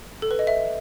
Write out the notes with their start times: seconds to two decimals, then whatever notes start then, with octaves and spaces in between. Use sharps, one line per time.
0.22 A4
0.31 B4
0.39 D#5
0.47 E5